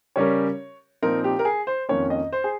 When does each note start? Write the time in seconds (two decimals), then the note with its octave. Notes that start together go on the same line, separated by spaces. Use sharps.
0.16 C#3 G3 C#4 G4 A#4 C#5
1.02 A#2 F3 C4 D#4 A#4
1.24 G4
1.39 A#4
1.45 G#4
1.67 C5
1.89 F2 D#3 A#3 C#4 C#5
2.10 D#5
2.32 C5
2.44 G#4